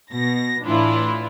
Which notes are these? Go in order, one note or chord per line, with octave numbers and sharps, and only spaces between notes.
B2 A#6
A2 E3 D4 E4 F4